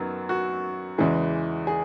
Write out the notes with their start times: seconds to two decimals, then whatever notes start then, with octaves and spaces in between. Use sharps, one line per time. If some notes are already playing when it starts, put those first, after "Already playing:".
Already playing: F#2 D#3 F#3 B3
0.29 F#4
0.98 E2 C#3 E3 G#3
1.67 G#4